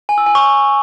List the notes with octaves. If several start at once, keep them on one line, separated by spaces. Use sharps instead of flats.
G#5
E6
G#5
C#6